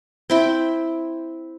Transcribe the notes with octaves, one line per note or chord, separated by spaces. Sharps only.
C4 E4 G5